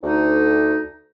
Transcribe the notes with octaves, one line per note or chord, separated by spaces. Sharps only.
D2 D#4